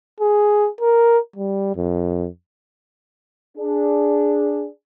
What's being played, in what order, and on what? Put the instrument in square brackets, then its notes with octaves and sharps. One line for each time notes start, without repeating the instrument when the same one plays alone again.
[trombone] G#4
A#4
G3
F2
[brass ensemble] D4 G#4